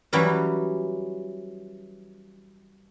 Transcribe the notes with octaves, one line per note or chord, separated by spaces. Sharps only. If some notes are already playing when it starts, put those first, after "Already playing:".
E3 F#3 G3 C#4